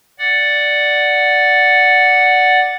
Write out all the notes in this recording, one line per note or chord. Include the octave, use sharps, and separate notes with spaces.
D5 F#5